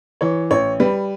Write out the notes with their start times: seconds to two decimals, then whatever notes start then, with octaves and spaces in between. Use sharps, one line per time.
0.21 E3 C#5
0.51 A1 C#5
0.80 G3 B4